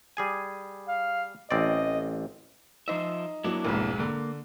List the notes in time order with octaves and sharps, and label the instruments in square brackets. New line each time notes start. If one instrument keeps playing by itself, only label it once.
[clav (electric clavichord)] G3 G#4 G#5
[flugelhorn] F5
[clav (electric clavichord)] A1 C4 D5 [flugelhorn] D#5
[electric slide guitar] F3 C5 E5 [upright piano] D#4
[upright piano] F#3 [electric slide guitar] A#3 D4 E4
[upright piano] F1 B1 G#2
[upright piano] D3 [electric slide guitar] A#3